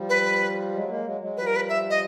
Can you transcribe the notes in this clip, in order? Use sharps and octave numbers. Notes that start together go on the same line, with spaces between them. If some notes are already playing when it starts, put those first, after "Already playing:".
Already playing: F3 G3
B4
F#3 G#3
G#3 A#3
F#3 G#3
F#3 G#3
F3 G3 B4
A#4
B4
E5
D#5